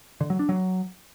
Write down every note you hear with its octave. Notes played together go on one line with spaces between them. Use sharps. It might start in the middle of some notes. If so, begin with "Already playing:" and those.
D3
F#3
D4
F#3